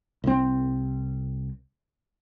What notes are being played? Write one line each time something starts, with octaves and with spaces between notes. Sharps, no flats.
C2 C4